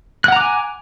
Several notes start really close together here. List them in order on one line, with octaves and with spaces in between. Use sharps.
F#6 F#5 A#5 D6 G#5